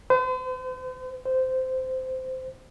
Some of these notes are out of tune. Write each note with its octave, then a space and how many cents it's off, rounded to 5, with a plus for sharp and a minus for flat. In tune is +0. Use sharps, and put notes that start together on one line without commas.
C5 -45
C5 -15